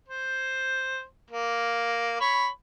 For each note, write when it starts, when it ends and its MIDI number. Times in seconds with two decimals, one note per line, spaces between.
0.08 1.03 72
1.30 2.17 58
2.20 2.48 73
2.20 2.48 83